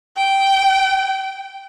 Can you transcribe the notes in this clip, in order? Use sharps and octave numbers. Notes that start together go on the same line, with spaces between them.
G5